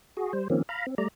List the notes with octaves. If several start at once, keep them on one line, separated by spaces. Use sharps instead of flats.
F#4 G#4
G3 C5
D#3 F3 A#3 C4 C#4
F5 A#5 B5
C4
G3 A3 D5 A#5